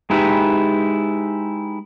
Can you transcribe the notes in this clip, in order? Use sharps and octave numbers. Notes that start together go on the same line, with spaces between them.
G#3 D#4 E4 G4 B4